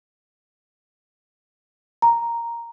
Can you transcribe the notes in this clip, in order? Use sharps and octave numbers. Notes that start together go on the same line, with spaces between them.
A#5